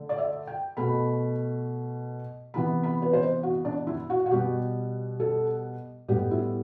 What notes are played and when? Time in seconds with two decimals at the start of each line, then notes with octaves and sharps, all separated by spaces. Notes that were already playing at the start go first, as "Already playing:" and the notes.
Already playing: D3 A3
0.09 D5
0.18 E5
0.47 G5
0.77 B2 A3 B5
2.54 C3 E3 B3 B5
2.83 B5
3.02 B4
3.13 C5
3.43 F#4
3.65 D4
3.87 E4
4.10 F#4
4.26 F#4
4.31 B2 G3 B3 G4
5.20 A4
6.08 A2 G3 B3 G4
6.31 E4